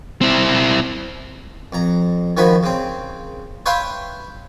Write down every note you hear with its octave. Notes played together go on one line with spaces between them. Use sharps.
C4 E4
F2 A#5
D#3 F3 F#4 G#5 B5
C#3 C4
B4 C#5 E5 F5 G5 C6